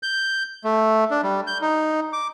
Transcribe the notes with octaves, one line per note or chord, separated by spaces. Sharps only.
G6
A3
D4
G3
G6
D#4
D6